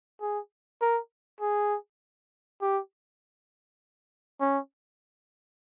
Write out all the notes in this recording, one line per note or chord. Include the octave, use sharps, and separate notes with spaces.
G#4
A#4
G#4
G4
C#4